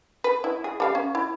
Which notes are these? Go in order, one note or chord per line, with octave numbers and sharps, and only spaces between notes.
B4
E4
G#4
G3 A4 F5
C#4
E4